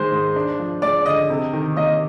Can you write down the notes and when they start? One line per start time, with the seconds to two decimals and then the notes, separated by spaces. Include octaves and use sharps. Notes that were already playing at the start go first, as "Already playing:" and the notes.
Already playing: D#3 G#3 D#4 C5 C6
0.12 G#2
0.36 D4
0.59 F3
0.82 G#3 D5 D6
1.05 D3 D#5 D#6
1.30 C3
1.53 D#3
1.76 A#3 D#5 D#6